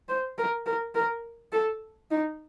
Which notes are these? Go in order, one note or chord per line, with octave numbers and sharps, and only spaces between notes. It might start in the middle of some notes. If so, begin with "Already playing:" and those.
C5
A#4
A#4
A#4
A4
D#4